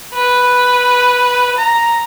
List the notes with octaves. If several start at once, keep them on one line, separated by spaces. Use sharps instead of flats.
B4
A#5